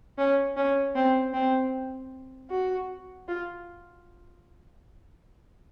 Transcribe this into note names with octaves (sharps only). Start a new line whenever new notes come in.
C#4
C#4
C4
C4
F#4
F4